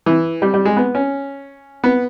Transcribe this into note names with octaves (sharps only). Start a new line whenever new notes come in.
E3
G3
G3
G#3
B3
C#4
B3